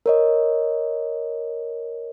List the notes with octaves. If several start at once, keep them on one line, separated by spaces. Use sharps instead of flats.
A#4 C#5 D#5